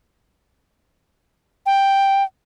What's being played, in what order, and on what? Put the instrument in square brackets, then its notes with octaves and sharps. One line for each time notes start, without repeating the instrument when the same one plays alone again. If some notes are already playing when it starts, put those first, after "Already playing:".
[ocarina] G5